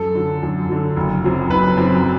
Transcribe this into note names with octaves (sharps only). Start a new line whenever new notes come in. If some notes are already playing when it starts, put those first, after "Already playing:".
Already playing: F#2 A4
D3 F#3
F#2
D3 F#3
F#1
F#2 F#3 C4
F#1 B4
F#2 F#3 C4